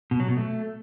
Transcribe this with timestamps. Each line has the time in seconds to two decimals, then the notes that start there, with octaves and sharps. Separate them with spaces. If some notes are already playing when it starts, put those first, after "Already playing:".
0.11 B2
0.20 F#3
0.28 B2
0.37 A3